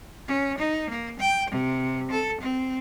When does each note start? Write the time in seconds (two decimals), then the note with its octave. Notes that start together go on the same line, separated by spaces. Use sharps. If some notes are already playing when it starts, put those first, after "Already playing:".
0.28 C#4
0.58 D#4
0.90 A#3
1.19 G5
1.50 C3
2.11 A4
2.41 C4